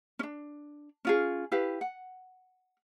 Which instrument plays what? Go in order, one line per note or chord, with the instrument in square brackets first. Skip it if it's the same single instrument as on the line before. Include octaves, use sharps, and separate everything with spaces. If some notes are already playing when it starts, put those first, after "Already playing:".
[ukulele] C#4 D4
C#4 F4 G#4
E4 G4 B4 F5
F#5